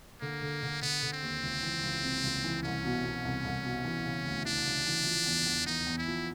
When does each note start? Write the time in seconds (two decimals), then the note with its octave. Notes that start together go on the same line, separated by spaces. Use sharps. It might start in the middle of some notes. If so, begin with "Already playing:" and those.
0.21 D3 A#3
0.42 D3
0.63 D3
0.82 D3 B3
1.03 D3
1.12 C4
1.22 D#2
1.43 C#2
1.63 E3
1.83 C#2
2.03 C3
2.24 C#2
2.44 E3
2.63 C2 C#4
2.84 B2
3.04 B2
3.25 C2
3.45 C2
3.64 B2
3.85 E3
4.05 C#3
4.25 D2
4.46 E3 D4
4.66 C#3
4.87 E3
5.06 F3
5.26 E2
5.46 E2
5.66 E2 D#4
5.87 E2
5.97 E4
6.08 F3